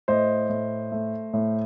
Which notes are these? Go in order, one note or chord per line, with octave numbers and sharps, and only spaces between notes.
A2 C5 D#5
A2
A3
A2